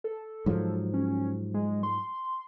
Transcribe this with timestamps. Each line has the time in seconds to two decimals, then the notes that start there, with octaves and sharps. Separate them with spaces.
0.04 A4
0.46 G#2 F3 F#3
0.94 C#4
1.54 G#3
1.83 C6